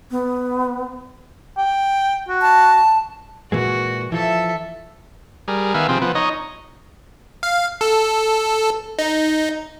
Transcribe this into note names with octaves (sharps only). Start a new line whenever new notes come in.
B3
G5
F#4
A5
A#2 E3 G#3 F#4
E3 F3 A4 E5
G3 G#4 A#4
D#3 B3 E5 F5 G#5
C3 F3 C4 G#4
F3 B3
D#4 C#5 D#5
F5
A4
D#4